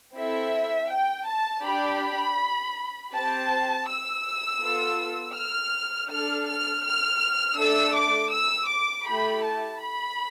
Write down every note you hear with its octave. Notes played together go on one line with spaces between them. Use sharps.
C4 E4 A4 E5
G5
A5
D4 G4 B5
C4 G4 A5
E6
B3 F4 A4
F6
D4 A4 F6
F6
F6
A3 D4 A4 E6
D6
E6
D6
A3 E4 G4 B5
A5
B5